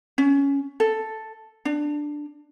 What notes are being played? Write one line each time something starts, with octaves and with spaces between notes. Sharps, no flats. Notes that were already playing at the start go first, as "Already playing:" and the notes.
C#4
A4
D4